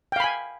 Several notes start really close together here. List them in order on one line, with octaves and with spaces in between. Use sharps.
G5 F5 B5 G#5